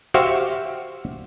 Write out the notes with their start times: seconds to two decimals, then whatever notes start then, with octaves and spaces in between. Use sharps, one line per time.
0.14 F#4 G4 C5 E5 F5